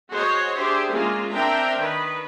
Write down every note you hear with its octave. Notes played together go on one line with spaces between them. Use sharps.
F#4 G#4 C5 C#5 D#5
D4 G4 G#4 C5 E5
G#3 A#3 C#4 F4
C4 D4 A#4 E5 G5 A#5
D#3 B4